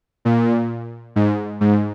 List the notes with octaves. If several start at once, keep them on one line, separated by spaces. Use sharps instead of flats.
A#2
G#2
G#2